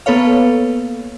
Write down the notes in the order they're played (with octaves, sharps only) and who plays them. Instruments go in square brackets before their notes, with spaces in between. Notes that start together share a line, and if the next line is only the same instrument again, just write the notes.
[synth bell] A#3 B3 A4 B4 C#5 F5